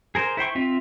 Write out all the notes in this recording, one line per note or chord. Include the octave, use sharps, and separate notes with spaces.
G#4 A#4 C5
E4 C5 G5 C#6
C4 F4 E5